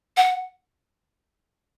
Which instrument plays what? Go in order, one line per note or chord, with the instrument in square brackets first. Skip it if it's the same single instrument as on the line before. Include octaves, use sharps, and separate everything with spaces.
[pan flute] F#5